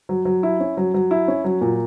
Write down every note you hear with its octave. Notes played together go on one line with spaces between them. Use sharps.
F#3
F#3
E4
C#4
F#3
F#3
E4
C#4
F#3
A#2